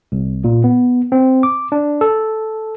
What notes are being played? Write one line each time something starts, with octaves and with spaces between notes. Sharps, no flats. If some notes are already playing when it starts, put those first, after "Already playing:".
C2
A#2
B3
C4
D6
D4
A4